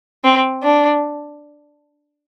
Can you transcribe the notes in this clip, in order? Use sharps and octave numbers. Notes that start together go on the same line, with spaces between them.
C4
D4